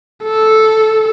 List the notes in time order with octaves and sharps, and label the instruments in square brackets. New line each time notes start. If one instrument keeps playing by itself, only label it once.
[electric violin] A4